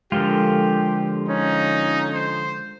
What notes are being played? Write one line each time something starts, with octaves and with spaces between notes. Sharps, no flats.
D3 F3 G#3 F4 G4 A4 A#4
C#4 D#4
C5